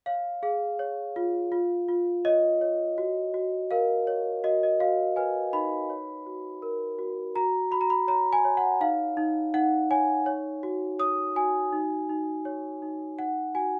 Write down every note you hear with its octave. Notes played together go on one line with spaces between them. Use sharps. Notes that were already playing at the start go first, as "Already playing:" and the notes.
C#5 F5
G#4 F5
C#5
F4
F4
F4
C#5 D#5
C#5
F#4
F#4
A#4 F5
C#5
F#4 D#5
D#5
F#4 F5
B4 G#5
D#4 B5
C#5
F#4
A#4
F#4
F#4 A#5
F#4 B5
A#5
B5
C#5 A#5
G#5
C#5
F#5
D#4 F5
D#4
D#4 F#5
C#5 G#5
C#5
F#4
C#5 D#6
F#4 G#5
D#4
D#4
C#5
D#4
D#4 F#5
F#4 G#5